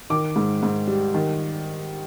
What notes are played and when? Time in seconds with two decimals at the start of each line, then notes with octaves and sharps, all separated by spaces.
0.10 D#3 D6
0.36 G#2
0.63 G#2
0.87 G3
1.14 D#3